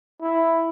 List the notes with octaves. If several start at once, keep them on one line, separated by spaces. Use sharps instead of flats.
E4